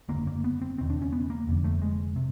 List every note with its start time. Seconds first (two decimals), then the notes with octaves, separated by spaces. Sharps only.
0.09 F#1 F#2 D3 A#3
0.27 A#3
0.44 B3
0.62 C4
0.78 E1 D#2 C#3 C4
0.90 D4
1.02 C#4
1.13 B3
1.30 A#3
1.47 F1 F2 D3
1.64 A3
1.82 G#3
2.16 C3